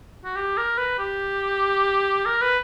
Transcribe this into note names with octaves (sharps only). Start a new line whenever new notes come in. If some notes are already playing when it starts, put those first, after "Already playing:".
F#4
G4
A#4
B4
G4
A#4
B4